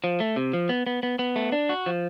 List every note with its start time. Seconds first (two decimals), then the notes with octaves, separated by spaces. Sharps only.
0.04 F3
0.20 A3
0.36 C3
0.53 F3
0.69 B3
0.87 B3
1.03 B3
1.19 B3
1.36 A3
1.52 D4
1.69 F#4
1.86 F3